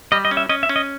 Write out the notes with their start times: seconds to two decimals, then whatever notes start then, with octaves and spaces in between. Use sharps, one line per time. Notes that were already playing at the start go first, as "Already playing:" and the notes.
0.12 G3 D#5
0.25 D#5
0.31 C#4
0.37 E5
0.49 C#4 D#5
0.63 E5
0.69 C#4
0.76 D#5